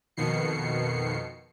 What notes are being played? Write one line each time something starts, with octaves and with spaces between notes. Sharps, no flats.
F2 B2 D#3 C7 C#7